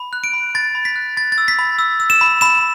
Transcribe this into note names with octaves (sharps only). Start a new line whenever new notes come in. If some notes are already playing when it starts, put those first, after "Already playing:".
Already playing: B5
F#6
D7
B5
B5 A6
B5
B6
F#6
B5 A6
A6
E6
B6
B5
E6
E6
E7
B5
B5 E7